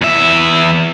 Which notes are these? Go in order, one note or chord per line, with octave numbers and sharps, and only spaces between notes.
E2 E5